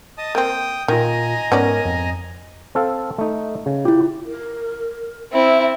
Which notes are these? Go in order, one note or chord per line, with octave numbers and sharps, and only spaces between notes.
D#5 A5 D#6
A#3 C4 G5 D#6
A#2 D#3 F4 D#5 G#5 A#5
G#2 B3 C#4 A#4 D5
F2
C4 A4 F5
A3 D#4
C#3
E4 F4 G4
A#4
C4 E4 E5